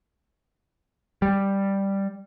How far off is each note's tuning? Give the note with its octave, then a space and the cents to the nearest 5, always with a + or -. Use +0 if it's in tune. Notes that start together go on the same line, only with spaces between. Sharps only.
G3 +5